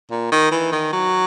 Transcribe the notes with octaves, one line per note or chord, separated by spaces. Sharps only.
A#2
D#3
E3
D#3
F#3